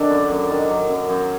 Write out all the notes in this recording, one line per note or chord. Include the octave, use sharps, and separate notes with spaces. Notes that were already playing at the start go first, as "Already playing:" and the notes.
Already playing: D3 D#3 F#3 D4
F#2
F#2
D#3
F#3
F#2
F#2